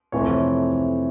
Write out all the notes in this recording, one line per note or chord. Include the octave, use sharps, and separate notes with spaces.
F2 C3 E3 A3 C4 C#5